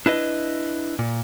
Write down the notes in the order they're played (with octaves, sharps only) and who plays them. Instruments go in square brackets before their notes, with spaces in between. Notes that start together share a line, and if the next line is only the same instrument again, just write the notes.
[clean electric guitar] D4 E4 B4 D#5
A#2